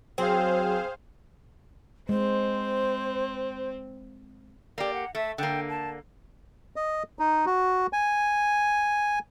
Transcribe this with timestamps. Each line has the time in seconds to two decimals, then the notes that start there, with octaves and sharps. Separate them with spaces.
0.18 F#3 C4 G#4 C5 F5
2.09 G#3 C4 C5
4.78 A#3 G4 D5
4.94 F#5
5.15 A3 E5
5.38 D3 A#3 G5
5.70 A5
6.76 D#5
7.19 D#4
7.46 F#4
7.93 G#5